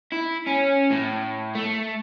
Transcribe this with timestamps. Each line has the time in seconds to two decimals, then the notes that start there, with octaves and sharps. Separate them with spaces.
0.12 E4
0.47 C#4
0.91 A2
1.55 A3